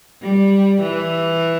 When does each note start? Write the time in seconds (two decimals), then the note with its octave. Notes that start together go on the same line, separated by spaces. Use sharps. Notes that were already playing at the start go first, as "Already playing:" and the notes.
0.22 G3
0.82 E3